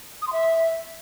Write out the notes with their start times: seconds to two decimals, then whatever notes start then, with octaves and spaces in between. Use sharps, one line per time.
0.22 D#6
0.27 C6
0.33 E5